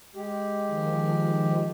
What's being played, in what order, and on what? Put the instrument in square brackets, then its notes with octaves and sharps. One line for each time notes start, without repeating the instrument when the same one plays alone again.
[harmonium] G#3 G4
[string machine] D#3 F3